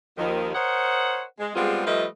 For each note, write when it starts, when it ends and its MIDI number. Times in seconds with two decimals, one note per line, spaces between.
0.18 0.51 39
0.18 0.51 51
0.18 0.51 53
0.54 1.22 70
0.54 1.22 72
0.54 1.22 73
0.54 1.22 75
0.54 1.22 78
1.39 1.53 56
1.56 1.86 55
1.56 1.86 56
1.56 1.86 59
1.56 1.86 60
1.56 1.86 65
1.56 1.86 68
1.86 2.06 53
1.86 2.06 55
1.86 2.06 57
1.86 2.06 71
1.86 2.06 75